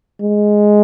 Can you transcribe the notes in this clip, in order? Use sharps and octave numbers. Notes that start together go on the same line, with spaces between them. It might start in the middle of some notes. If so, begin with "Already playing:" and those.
G#3